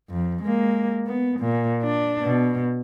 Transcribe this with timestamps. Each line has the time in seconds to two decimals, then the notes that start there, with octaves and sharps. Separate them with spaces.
0.10 F2
0.43 G#3 A#3
1.07 B3
1.40 A#2
1.83 D4
2.23 B2